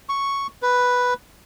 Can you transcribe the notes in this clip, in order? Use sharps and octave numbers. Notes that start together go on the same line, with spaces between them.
C#6
B4